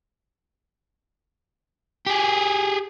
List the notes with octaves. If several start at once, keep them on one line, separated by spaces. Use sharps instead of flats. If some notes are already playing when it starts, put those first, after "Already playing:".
G4 G#4